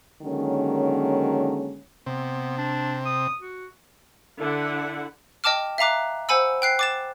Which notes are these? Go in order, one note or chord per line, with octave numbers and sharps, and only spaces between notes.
D3 D#3 F#3 G#3 A#3 C#4
C3 B3
D4
D#6
F#4
D3 E4 F#5
D#5 G5 A5 D6 F6
E5 F5 A#5 D6 F#6
C5 F#5 G#5 B5 E6
G5 F#6 C7
D6 A6 E7